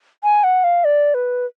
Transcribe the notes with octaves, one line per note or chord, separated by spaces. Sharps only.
G#5
F#5
F5
D5
B4